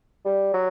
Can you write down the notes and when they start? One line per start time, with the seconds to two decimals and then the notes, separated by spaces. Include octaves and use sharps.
0.25 G3
0.53 F#3